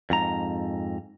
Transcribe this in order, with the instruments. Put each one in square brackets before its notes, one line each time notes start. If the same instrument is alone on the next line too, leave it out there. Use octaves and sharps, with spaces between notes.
[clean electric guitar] F2 G#2 A#5